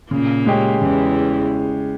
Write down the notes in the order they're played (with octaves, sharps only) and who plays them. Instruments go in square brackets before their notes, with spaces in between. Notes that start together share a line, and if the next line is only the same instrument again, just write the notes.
[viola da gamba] A#2 A#3 [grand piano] C#3
[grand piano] G#3 C#4 G4
[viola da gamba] E2 E3 [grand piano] C#3